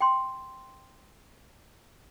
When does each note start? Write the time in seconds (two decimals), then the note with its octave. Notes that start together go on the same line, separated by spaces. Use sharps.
0.01 G5 C6